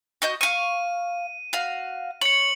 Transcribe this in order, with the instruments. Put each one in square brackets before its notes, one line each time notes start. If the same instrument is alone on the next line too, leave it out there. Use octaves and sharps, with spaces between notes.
[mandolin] F#4 D#5 G6
[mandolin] F5 C#6 [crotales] D#7
[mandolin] F#4 F5
[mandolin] C#5 [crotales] C#7 F#7